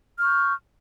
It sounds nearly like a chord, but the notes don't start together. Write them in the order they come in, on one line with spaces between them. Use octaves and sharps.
F6 C#6 G6